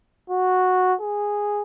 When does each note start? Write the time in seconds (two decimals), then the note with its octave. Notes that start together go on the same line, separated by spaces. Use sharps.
0.30 F#4
1.01 G#4